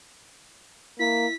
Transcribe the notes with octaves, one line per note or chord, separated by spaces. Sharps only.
A#3 E4 B6